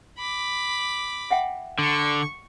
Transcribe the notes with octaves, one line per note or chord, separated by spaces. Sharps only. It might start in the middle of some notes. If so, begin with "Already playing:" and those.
B5 D6
E5 F#5 G5
D3 C#6